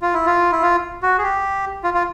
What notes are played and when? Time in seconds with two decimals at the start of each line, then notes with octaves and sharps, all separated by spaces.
0.02 F4
0.14 E4
0.26 F4
0.52 E4
0.62 F4
1.03 F#4
1.18 G#4
1.23 G4
1.84 F4
1.94 F4